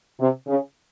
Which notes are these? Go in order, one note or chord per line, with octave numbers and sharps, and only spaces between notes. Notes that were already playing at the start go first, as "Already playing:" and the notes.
C3
C#3